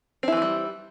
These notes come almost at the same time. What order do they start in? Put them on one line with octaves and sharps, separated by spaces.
C4 E4 E3 G#3 G3